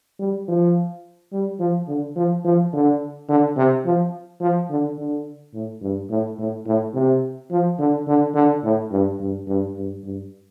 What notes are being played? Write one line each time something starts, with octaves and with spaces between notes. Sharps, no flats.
G3
F3
G3
F3
D3
F3
F3
D3
D3
C3
F3
F3
D3
D3
A2
G2
A2
A2
A2
C3
F3
D3
D3
D3
A2
G2
G2
G2
G2
G2